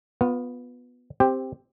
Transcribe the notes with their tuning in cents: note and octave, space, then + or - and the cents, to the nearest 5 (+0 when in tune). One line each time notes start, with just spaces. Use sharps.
B3 +0 F4 +30
C4 +0 G4 +5